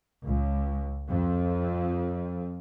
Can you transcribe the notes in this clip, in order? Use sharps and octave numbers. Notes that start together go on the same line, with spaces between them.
C#2
F2